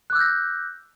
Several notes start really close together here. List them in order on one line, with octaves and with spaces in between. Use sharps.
F#6 D6 E6 G6 A#6